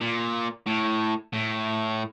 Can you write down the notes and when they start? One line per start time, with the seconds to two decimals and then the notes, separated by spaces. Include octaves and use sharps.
0.01 A#2
0.66 A2
1.33 A2